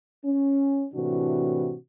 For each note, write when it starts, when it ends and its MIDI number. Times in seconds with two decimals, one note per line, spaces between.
0.23 0.84 61
0.93 1.74 45
0.93 1.74 48
0.93 1.74 52
0.93 1.74 62
0.93 1.74 66